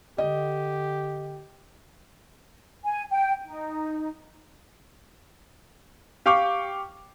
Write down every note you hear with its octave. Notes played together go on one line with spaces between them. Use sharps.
D3 G4 D#5
G#5
G5
D#4
G4 F5 G5 C#6 D6